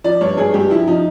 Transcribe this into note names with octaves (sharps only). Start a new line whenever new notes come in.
F3 D5
G2 C#5
G2 G#4
G2 G4
F3 E4
F3 D#4